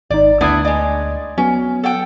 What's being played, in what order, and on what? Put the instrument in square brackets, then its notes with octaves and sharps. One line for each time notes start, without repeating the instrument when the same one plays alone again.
[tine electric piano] G#1 D#4 [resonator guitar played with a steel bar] D5
[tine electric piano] D2 D#6 G#6 [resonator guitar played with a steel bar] B3 D4 E4
[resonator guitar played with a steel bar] G#3 D5
[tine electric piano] F#3 B3 [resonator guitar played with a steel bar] C#4
[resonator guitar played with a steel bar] A4 F#5 G5